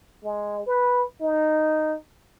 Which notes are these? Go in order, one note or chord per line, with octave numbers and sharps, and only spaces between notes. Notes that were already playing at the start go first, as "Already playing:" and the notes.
G#3
B4
D#4